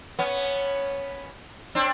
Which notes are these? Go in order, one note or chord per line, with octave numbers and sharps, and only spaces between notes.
B3 C#4
C4 D4